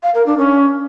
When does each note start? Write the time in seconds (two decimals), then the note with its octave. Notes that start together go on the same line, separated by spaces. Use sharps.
0.03 F5
0.15 A#4
0.26 D4
0.38 C#4